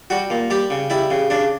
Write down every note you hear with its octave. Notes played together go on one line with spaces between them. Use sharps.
G3 F#4
A#2
G3 G4
C#3
G3 E4
C#3
C#3 D4